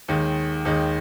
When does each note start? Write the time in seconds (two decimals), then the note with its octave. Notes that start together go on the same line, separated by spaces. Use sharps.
0.08 D#2 D#3 G#3
0.65 D#2 D#3 G#3